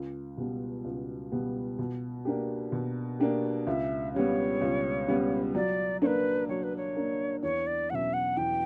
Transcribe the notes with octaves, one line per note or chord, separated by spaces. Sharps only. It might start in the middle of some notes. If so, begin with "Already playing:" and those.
Already playing: C#2
B2 G3 B3
C#2
B2 G3 B3
B2
A#3 D4 G4
B2
A#3 D4 G4
C#2 E5
C#3 G3 B3 C#5
C#2
C#3 G3 B3
F#3 D5
A#3 D4 B4 C#5
F#3 C#5
B4
C#5
A#3 D4
E2 C#5
D5
B2 F#3 C#4 E5 F#5
F#5
E2 G5